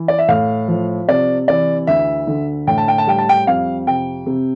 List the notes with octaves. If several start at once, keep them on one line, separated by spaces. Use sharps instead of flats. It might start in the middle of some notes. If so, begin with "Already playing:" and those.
Already playing: E3
D5
E5
A2 F5
F3
C3 D5
E3 D5
D2 E5
D3
A2 G5
A5
G5
A5
G3 G5
A5
G5
F2 F5
C3 G5
C3